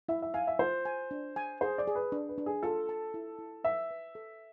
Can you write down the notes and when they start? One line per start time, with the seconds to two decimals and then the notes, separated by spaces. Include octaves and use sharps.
0.09 E4 E5
0.22 E5
0.34 F5 G#5
0.47 E5
0.59 F4 C5
0.85 G#5
1.11 D4
1.36 G#5
1.61 G#4 C5
1.78 D5
1.87 G#4
1.95 B4
2.12 D4
2.29 B4
2.38 D4
2.46 G#4
2.63 F4 A4
2.89 A5
3.14 E4
3.39 E4
3.64 B4 E5
3.91 B4
4.15 A4